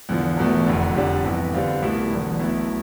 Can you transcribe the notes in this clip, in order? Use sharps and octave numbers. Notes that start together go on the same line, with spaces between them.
E2 D3 F3
E1 E2 B2 A3
F1 F2 D3
F1 F2 D3 G3 D4
G1 F2 C3 E3
D3 G3 C4 F4 B4
C2 B2 A3 E4 G4
E1 E2 D3
B1 B2 A3 E4